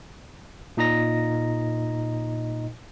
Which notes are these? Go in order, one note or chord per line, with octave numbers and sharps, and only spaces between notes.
A#2 D#4 D#5 A#5 A#6